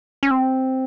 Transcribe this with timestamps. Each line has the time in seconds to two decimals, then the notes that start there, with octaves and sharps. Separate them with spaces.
0.23 C#4
0.31 C4